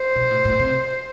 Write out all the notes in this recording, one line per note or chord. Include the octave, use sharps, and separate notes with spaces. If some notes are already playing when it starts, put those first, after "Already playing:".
Already playing: C5
B2
A2
A2
C3